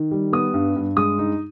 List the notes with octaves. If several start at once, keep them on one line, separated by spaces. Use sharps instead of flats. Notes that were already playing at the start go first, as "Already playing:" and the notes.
Already playing: D#3
G3
B3 D#6
G2
G2
G#3 D#6
D#4